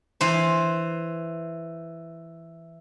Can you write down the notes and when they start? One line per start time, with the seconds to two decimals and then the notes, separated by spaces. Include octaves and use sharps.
0.21 E3 C5